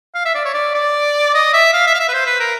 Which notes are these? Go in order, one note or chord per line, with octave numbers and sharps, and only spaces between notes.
F5
E5
D5
C#5
D5
D5
D#5
E5
F5
E5
F5
E5
B4
C5
B4
A#4